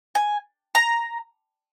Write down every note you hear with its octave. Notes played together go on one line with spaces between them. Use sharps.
G#5
A#5